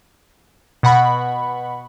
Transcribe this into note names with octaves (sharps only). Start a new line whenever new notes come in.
B2 F#5 B5 C#6